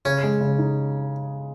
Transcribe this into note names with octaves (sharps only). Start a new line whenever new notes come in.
C#3 C#4
G#3
C#3
D#4